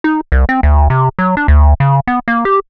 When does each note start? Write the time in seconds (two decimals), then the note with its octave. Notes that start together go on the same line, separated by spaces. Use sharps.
0.04 D#4
0.32 C2
0.49 C4
0.63 D2
0.90 C3
1.19 F#3
1.37 D4
1.48 D2
1.80 C#3
2.07 B3
2.28 A#3
2.45 G4